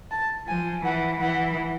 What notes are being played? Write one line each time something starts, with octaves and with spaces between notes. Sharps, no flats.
A5
F3 G#5
E3 F#5
E3 F#5